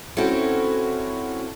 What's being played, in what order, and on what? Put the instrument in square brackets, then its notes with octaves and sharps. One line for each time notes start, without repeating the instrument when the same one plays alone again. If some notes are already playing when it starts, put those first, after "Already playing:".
[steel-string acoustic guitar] C4 A4 [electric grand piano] C#4 E4 F#4